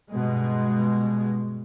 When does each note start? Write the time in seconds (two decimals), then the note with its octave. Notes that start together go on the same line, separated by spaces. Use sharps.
0.11 G2 B2 G#3